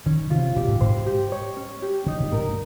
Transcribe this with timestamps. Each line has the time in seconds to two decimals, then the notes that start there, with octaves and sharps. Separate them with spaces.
0.06 D#3 C#4
0.30 C3 F4
0.56 A#2 G4
0.68 G#2
0.81 G#2 C5
1.06 G4
1.32 C#5
1.56 C#4
1.82 G4
2.06 C#3 D#4
2.20 A#2
2.32 G2 A#4